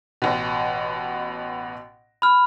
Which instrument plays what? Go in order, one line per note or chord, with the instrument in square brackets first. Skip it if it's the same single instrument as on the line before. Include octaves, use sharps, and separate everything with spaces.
[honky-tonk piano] A1 B2
[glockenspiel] B5 F6